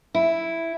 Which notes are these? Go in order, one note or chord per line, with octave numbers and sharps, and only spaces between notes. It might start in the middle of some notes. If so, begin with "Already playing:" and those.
E4